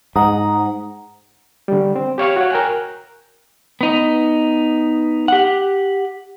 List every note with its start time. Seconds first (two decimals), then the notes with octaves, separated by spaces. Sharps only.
0.16 G#2 F#5 A#5 D#6
1.68 D3 G3
1.96 C4
2.18 G4 C#5 F5 C#6
2.36 F#4 C#5
2.50 A#4 G5 G#5 F#6
3.81 B3 D#4
5.28 G4 F#5